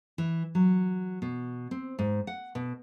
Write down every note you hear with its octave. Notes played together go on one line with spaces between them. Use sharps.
E3
F#3
B2
C4
G#2
F#5
B2